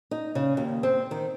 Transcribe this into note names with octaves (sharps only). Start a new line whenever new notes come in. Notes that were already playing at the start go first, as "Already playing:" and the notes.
D#4
C#3
D#2
C4
D#3